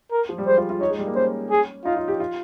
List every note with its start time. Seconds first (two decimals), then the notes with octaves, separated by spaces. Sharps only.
0.11 A#4
0.29 F3
0.38 G3
0.47 G#3 C5
0.57 F4
0.70 F4
0.81 D#4 C#5
0.90 G#3
0.99 G3
1.07 A#3
1.15 C#4 C5
1.51 G#4
1.85 D#4 F4
1.96 F4
2.08 G4
2.20 F4